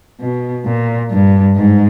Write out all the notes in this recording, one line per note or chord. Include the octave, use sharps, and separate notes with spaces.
B2
A#2
G2
G#2